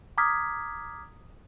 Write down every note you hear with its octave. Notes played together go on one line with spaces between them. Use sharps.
A#5 D6 D#6 F6 G#6 B6